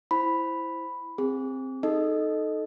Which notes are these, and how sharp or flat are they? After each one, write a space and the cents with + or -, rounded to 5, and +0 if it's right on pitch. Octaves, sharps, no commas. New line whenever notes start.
E4 +10 C5 +0 B5 +0
C4 +5 G#4 -30
D#4 +0 A4 -10 D#5 +0